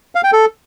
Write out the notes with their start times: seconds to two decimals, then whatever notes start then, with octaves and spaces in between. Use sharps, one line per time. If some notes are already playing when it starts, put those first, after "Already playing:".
0.15 F5
0.24 G5
0.33 A4